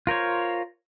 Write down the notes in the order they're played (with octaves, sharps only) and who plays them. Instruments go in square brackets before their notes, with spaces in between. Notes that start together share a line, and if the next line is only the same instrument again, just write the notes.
[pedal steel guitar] F4 A#4 C5 C#5